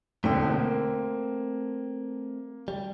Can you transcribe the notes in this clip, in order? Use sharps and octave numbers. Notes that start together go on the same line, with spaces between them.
E1 D3 A3 C4 G5
A#3
G3